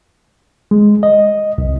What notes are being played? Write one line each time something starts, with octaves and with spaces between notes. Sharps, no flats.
G#3
D#5
C2